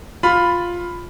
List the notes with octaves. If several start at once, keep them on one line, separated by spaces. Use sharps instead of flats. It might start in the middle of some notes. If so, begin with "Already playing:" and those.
F4 B5